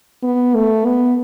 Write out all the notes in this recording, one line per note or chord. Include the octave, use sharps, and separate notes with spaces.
B3
A3
B3